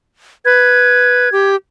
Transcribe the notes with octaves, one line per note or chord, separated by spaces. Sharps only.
B4 G#6
G4